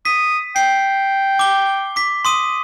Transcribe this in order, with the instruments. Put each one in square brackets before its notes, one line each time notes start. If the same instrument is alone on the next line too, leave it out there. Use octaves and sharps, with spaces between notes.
[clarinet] D#6 [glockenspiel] B6
[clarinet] G5 [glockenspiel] C7
[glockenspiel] D6 G7
D6 B6
C6 D#6 D#7